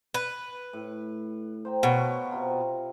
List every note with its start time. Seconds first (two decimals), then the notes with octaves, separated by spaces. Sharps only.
0.14 B4
0.73 A2
1.65 C5 G5 A#5
1.83 B2 C#5 F5
2.32 C3 F4 A#5